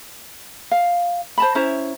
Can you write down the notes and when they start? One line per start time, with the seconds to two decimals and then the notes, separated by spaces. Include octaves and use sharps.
0.71 F5
1.38 C5 A5 B5
1.55 C#4 E4 C5 A#5